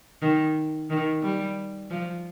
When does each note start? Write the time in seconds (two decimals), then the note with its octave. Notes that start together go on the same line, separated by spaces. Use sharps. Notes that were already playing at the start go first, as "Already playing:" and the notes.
0.22 D#3
0.90 D#3
1.22 G3
1.91 F3